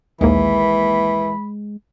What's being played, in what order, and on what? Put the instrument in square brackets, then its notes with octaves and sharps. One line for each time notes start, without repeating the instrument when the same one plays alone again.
[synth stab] A#1 D#2 A#3 [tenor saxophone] E3 [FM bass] G#3 [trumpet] B5